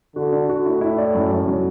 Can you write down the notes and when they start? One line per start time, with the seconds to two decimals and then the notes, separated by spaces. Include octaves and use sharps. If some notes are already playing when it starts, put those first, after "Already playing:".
0.16 D3 F#4
0.32 D4
0.49 F#4
0.66 A2 E4
0.81 E4
0.98 D5
1.15 F#2
1.32 F#2
1.48 F#3